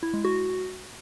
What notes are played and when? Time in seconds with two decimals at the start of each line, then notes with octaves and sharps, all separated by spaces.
0.03 E4
0.14 G#3
0.25 F#4